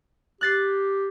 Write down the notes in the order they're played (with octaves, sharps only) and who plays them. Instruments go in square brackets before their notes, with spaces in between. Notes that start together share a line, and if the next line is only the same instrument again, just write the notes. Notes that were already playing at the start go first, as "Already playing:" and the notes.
[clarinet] G4 [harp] F#6 A6 C7